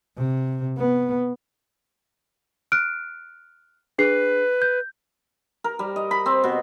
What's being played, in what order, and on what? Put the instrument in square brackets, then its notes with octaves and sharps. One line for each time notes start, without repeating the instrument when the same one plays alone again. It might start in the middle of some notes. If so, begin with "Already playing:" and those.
[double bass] C3
B3
[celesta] F6 F#6 D7
[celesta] D4 G#4 C7 [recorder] B4
[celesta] G6
[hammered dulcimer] A#4
G3
D#5
B5
C4
B2